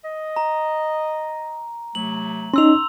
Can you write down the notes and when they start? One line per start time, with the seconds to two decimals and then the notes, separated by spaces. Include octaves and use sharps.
0.04 D#5
0.36 A#5
1.95 C3 F#3 A3 F#7
2.54 C#4 D#4 C6 E6 F7